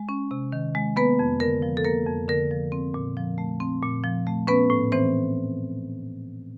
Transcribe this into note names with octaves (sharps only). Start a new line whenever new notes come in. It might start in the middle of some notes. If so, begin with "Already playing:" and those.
Already playing: G#3
C#4
C3
D#3
G#3
A#3 B3 B4
F2
D3 A#4
F3
A4
A#3 A#4
F2
D3 A#4
F3
C4
A#2
F3
A3
C4
A#2
F3
A3
B3 C#4 B4
A2
E3 C4 C5